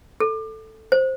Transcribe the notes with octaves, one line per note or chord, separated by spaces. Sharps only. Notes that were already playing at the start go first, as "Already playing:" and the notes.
A4
C5